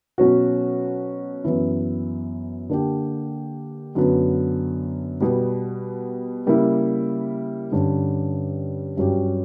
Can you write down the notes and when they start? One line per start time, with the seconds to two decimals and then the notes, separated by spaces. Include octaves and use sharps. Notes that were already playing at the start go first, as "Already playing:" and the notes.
0.18 B2 F#3 C#4 F#4
1.44 F#2 E3 B3 E4
2.69 D3 A#3 D4 G4
3.95 F#2 D3 F#3 B3
5.20 B2 G3 B3
6.46 C#3 G3 A#3 E4
7.72 G2 D3 G3 C#4
8.97 G2 F#3 C#4 G4